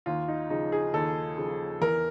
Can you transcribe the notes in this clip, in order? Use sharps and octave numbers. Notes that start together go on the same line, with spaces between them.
D#2 F4
D#4
C#3 F3 D#4
G#4
D#2 A4
C#3 F3
E2 A#4